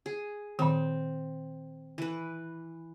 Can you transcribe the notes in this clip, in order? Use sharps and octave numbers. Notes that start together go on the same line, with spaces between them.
G#4
A#2 D#3 C4
E3 B4